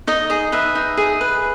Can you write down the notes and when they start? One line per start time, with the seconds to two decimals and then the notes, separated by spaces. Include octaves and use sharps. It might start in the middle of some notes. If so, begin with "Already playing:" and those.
0.07 D#4 D#5
0.30 G#4 D#5
0.52 B4 E5
0.75 D#4
0.97 G#4
1.21 B4